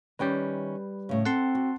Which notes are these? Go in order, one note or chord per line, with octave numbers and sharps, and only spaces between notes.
D#3 G3 C#4 B4 G5
A2 C#3
C4 A4 F#5 A5 C6
F#4